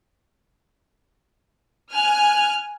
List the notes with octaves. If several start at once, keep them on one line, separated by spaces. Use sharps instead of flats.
G#5 F6 F#6